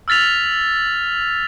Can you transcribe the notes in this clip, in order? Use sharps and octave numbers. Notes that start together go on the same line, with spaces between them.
E6 F6 A6 B6 F7